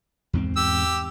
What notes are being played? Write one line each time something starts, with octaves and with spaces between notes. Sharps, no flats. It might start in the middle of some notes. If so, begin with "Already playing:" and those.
E2 G#2 C4
G4 E6